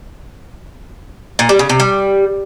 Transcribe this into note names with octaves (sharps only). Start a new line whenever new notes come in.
A#2
G3
C#3
C3
G3